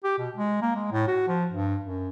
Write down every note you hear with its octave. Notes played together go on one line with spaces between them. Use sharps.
G4
B2
G#3
A#3
G#3
A2
F#4
F3
G2
F#2